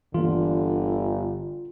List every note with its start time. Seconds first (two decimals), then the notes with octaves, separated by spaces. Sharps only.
0.14 G1 D3 E3 A#3 F4